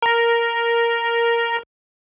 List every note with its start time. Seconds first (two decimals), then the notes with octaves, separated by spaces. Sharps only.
0.02 A#4 A#5